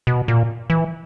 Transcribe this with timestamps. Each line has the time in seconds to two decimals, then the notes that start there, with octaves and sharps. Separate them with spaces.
0.07 B2
0.28 A#2
0.70 E3